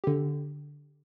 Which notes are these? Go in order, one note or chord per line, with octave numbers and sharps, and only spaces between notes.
D3 G4